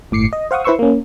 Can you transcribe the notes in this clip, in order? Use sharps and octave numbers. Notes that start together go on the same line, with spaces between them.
G1 A2 D6 C7 C#7
D#5
C5 F5 F#5 C#6 D#6
E4 B4 C5 C6 C#6 E6
A#3 C#4